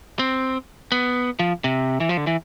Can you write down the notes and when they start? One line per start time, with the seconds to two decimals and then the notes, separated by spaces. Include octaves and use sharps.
0.19 C4
0.92 B3
1.39 F3
1.64 C3
2.00 E3
2.09 F3
2.17 D3
2.27 E3